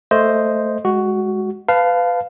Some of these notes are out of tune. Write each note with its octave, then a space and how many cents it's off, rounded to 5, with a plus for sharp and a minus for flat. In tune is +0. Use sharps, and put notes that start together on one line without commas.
A3 +5 C5 +0 D#5 +0
G#3 +0 F#4 +10
B4 +20 F5 +0 A5 +0